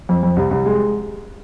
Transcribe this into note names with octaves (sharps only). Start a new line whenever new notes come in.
F2
F2
C2
C2
G#3